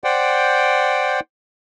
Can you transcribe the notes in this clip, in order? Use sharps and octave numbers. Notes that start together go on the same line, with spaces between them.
C5 D5 F#5 G5